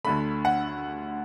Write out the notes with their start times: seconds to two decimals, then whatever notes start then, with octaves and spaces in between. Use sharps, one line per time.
0.04 D2 D3 A3 B5
0.45 F#5